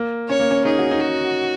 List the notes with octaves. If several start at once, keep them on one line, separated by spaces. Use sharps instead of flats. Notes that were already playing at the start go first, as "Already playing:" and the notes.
Already playing: A#3
C#4 C#5
A#3
C#4
D#4 G#4
F#4
D#4
F#4